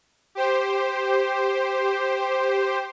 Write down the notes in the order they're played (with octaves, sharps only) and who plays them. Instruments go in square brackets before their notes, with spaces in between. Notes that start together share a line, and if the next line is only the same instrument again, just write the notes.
[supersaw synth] G4 C5